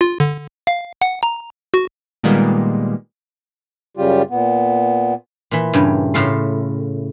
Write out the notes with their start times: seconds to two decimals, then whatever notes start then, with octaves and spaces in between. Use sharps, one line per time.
0.01 F4
0.20 D3
0.67 F5
1.02 F#5
1.23 A#5
1.74 F#4
2.24 A#2 D#3 G3 G#3 A#3 B3
3.97 F#2 C#3 G3 F4 G4
4.30 A#2 B3
5.51 A#2 E3
5.73 G2 C#3
6.14 A2 C#3 F4 A4 C6